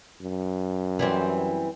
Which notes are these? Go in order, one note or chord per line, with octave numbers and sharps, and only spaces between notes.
F#2
E3 G3 C4